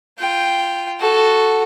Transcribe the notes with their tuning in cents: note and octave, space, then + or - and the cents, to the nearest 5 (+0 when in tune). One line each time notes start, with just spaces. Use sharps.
F4 -10 G5 +0
F#4 +0 A4 +0